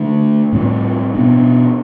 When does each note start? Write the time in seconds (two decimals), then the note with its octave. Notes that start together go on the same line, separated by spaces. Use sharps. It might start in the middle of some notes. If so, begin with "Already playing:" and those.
Already playing: D3 A3 D4
0.53 A2 G3 C4
1.14 B2 B3 D4